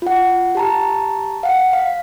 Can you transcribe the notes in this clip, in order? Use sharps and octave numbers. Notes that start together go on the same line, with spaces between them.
F4 F#5
G4 A5 A#5
F5 F#5
F5